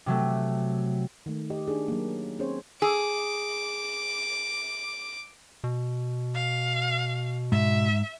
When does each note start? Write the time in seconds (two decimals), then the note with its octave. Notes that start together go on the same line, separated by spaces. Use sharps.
0.06 C3 F#3 A3
1.26 D#3 A3
1.50 G4 D#5
1.68 D4 D#4 G#4
1.88 F#3 A#3
2.39 C4 C#4 G#4 C5 C#5
2.82 G#4 D6
5.64 B2
6.34 F5
7.52 G#2 E5